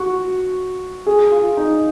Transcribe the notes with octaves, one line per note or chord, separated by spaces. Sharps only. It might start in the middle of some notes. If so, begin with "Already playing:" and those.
Already playing: F#4
G#4
F4
D#4